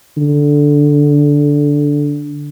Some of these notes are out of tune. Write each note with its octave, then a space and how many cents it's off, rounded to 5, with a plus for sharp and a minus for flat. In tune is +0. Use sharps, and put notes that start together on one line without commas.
D3 -5